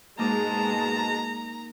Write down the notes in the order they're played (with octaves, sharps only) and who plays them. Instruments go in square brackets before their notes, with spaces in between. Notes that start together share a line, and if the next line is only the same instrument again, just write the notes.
[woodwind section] G#2 B2 A5 [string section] G#3 [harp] A#3 D#4 D6 [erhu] A#5